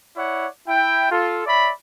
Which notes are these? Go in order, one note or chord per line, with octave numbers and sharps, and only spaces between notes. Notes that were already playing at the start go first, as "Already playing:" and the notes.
E4 C#5 D5 F#5
E4 G5
F4 A4
C#5 D5 E5 B5